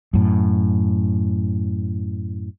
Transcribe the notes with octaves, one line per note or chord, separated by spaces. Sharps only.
F#2 A2